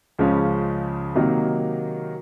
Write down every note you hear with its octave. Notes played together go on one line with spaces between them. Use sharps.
C#2 C#3 F3 G#3 C#4
C3 D#3 F#3 A#3 D#4